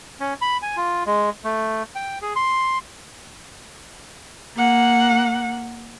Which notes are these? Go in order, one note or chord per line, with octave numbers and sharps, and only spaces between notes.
C#4
B5
G#5
F4
G#3
A3
G5
G#4
C6
A#3 F#5